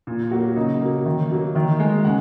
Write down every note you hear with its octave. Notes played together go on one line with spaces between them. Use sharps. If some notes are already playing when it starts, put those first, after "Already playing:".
A#2
F#3 A#3 F#4
C#3 D#4
F#3 A#3
D#3
F#3 A#3
D#3
G#3
C#3 F#5